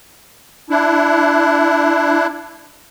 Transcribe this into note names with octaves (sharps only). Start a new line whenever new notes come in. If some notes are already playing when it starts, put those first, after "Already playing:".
D4 E4